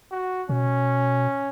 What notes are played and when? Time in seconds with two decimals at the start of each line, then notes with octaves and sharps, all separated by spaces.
0.11 F#4
0.49 B2 C#4